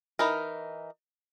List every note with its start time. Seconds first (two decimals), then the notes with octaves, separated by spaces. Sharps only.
0.19 E3 D#4 A#4